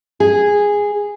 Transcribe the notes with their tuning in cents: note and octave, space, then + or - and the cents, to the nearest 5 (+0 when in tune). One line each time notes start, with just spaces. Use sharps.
G#4 -10